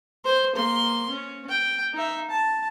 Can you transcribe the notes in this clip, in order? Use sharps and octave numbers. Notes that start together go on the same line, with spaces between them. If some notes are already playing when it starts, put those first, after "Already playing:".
C5 C6
A#3 C6
C#4
G5
D#4 E5
A5